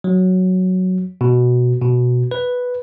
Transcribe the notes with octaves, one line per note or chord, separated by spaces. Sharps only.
F#3
B2
B2
B4